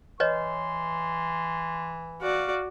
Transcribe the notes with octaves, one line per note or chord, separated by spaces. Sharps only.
E3 B4 C#5 D#5 C6
F#4 D5 F5